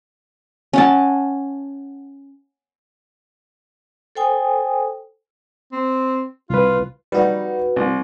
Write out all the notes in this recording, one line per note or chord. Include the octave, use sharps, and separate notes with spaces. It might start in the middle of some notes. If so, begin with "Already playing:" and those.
C#4 F#5 A5
A4 C5 G5 G#5 D#6
C4
C2 F4 B4
G3 D#4 F#4 B4
C2